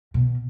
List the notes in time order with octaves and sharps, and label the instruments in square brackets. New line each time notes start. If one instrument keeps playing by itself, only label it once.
[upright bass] B2